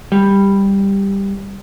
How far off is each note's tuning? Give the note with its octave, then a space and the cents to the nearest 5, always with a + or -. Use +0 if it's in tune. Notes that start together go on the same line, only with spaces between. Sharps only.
G3 +10